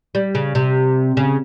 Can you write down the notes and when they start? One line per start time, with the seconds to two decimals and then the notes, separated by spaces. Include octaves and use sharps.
0.15 G3
0.35 C#3
0.55 C3
1.17 C#3